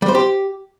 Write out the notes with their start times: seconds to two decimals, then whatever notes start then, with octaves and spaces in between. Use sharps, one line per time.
0.02 G3
0.08 C5
0.15 G4